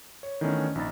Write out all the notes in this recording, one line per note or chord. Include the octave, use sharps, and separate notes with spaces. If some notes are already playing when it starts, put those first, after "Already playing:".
C#5
D#3 E3 A3 B3 C#4 D4
A#1 D#4 B5 A6